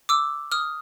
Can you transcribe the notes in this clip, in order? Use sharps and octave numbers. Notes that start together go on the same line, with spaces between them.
D6 E6
D#6 F6